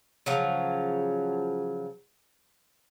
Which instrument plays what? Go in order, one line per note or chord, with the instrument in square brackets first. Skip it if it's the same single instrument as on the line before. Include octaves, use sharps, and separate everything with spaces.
[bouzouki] C#3 F3 F#3